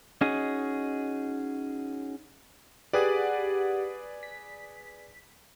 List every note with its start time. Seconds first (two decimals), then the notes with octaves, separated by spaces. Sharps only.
0.21 C#4 D#4 F#4 G#4 D#5
2.93 G4 G#4 B4 D5 F#5
4.23 B6